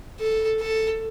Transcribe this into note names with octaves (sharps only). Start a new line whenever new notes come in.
A4
A4